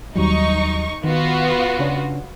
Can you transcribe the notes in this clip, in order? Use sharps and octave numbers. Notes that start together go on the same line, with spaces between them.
D#2 F#3 G3 D#4 C#6
D#3 B3 F4 F#4
C#3 C#4 D4